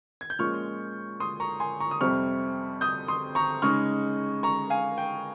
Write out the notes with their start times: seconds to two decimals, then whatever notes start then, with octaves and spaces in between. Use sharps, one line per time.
0.21 G#6
0.30 G6
0.39 A#2 F3 G#3 C#4 F4 C#6 F6
1.20 C6 D#6
1.40 A#5 C#6
1.60 G#5 C6
1.80 A#5 C#6
1.91 D#6
2.01 F2 C3 G3 C4 C#6 F6
2.81 D#6 G6
3.08 C6 D#6
3.35 A#5 C#6
3.62 C#3 G#3 D#4 C#6 F6
4.43 A#5 C#6
4.70 F5 G#5
4.98 G5